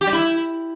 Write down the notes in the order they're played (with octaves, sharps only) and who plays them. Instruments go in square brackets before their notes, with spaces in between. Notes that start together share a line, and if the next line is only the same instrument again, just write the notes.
[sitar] G4
G3
E4